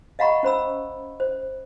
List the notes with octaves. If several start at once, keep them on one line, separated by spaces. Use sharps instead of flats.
D#5 F5 F#5 A#5 B5 C#6
C#4 C5 B5 E6
C5